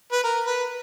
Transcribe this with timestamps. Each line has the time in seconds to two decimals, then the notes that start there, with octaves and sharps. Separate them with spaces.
0.12 B4
0.24 A#4
0.46 B4